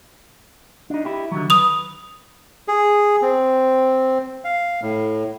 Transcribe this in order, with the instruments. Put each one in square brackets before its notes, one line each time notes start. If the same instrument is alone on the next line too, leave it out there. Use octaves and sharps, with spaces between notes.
[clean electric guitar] D4 D#4
E4 G4
D3 D#3 F#3
[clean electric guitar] B4 [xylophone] D#6 F7
[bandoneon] G#4
C4
F5
A2